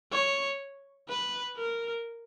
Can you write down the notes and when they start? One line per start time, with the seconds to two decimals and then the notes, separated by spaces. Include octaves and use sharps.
0.12 C#5
1.08 B4
1.56 A#4